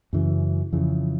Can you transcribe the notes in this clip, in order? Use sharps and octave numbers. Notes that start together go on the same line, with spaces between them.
F#2 C#3 E3
F2 C#3 E3